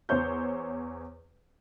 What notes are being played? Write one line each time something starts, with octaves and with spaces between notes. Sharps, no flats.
E2 C5 C#5 G6